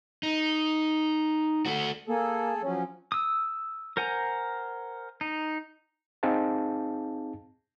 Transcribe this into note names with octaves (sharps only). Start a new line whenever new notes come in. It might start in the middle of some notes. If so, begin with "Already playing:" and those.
D#4
A3 F#4
A#3 G#4 A4
F3 F#3 C#4 C#5
D#6 E6
A#4 C5 F#5 G#5 A#5
D#4
C4 D#4 G#4 F5 A5